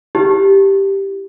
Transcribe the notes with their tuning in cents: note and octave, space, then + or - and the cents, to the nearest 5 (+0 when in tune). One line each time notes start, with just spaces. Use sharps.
E4 +0 G4 +0